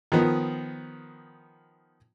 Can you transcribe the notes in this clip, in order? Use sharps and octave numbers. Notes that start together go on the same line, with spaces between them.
D#3 F3 B3